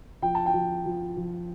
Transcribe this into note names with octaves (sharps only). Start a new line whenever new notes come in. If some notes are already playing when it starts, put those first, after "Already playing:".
F3 G5
A5
G5
F3
F3
F3